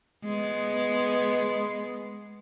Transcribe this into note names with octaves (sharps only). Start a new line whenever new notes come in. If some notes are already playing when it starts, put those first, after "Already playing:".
G#3 B3